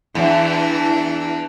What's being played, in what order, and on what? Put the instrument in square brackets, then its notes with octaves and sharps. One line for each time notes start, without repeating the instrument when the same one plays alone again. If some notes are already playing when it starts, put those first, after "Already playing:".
[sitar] E2 [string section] E3 D4